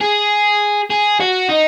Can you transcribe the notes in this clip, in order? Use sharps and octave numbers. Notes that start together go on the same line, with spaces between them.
G#4
G#4
F#4
D#4